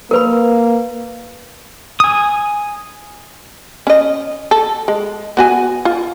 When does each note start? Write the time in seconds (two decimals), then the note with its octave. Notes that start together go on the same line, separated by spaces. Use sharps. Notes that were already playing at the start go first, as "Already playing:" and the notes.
0.11 A#3 A#4 B4 B5
2.00 G#5 D#6
3.87 C#4 D#5
4.51 A4
4.88 G#3
5.37 B3 F#4 G#5
5.85 F4